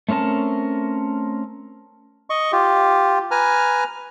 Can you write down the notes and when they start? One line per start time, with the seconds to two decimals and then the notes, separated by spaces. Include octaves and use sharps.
0.08 A3 C4 C#4 A#4 A5
2.30 D#5 C#6
2.52 F4 G4
3.31 B4 G#5 A#5 F6